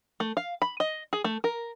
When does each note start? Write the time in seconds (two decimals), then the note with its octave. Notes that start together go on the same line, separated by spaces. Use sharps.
0.20 A3
0.37 F5
0.62 B5
0.80 D#5
1.13 G#4
1.24 A3
1.44 A#4